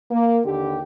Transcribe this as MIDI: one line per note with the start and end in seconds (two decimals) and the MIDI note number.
0.11 0.40 58
0.46 0.81 39
0.46 0.81 50
0.46 0.81 67